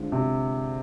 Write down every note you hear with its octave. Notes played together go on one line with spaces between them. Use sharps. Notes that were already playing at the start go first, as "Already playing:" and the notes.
Already playing: D3 G#3 C4 F4
C3